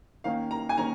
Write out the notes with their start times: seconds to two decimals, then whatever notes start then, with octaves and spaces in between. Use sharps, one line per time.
0.24 D#3 A#3 C#4 F5
0.51 A#5
0.69 G#5
0.77 D#3 A#3 C#4 A#5